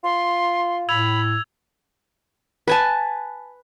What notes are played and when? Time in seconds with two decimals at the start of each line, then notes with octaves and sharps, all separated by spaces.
0.04 F4 C6
0.89 A2 B5 E6 G#6 F7
2.67 B4 G#5 A5